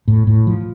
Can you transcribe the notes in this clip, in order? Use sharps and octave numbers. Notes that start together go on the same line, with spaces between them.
A2
A2
F3